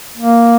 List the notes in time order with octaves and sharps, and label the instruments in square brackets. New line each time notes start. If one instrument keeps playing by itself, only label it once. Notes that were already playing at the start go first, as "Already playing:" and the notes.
[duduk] A#3